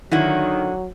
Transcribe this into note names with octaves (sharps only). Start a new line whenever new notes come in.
D3 D#3 F#3 E4 F#4